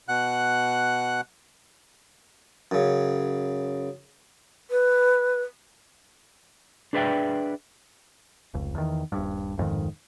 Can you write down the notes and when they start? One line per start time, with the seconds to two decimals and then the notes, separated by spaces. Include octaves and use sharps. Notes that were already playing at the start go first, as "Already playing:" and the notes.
0.08 B2 F#5 F#6
2.71 F#2 C#3
4.71 B4
6.93 D4 G#4 B4 D5 E5 G5
8.54 F1 C#2
8.75 E2 D#3
9.12 D#1 G2
9.58 D1 F2 G#2 D#3